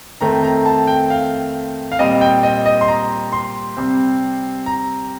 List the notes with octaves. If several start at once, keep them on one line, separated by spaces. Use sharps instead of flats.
F2 D#3 A3 C4 A#5
A#5
A5
G5
F5
F5
A#2 G3 C4 D#5
G5
D#5
D#5
C6
A#5
C6
C3 G3 C4
A#5